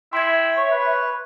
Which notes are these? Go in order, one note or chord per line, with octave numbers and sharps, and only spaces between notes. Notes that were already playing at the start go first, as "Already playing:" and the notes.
E4 E5 G5 C6 G#6
C#5
B4